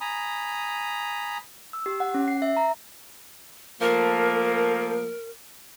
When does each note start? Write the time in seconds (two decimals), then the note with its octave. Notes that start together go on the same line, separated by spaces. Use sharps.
0.01 G#5 A#5 B5 D#6
1.73 E6
1.86 G4
2.00 F#5
2.14 C#4
2.28 C7
2.42 E5
2.57 A#5
3.82 F3 A3 A#3 A#4